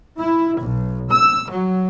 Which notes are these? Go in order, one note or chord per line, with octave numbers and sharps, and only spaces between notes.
E4
B1
E6
F#3